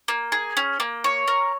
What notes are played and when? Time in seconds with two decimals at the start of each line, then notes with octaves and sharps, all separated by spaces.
0.08 A#3
0.32 G#4
0.57 C#4
0.80 A#3
1.04 C#5
1.28 A#4